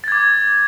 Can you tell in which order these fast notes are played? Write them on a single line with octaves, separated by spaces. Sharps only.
A6 G#6 D6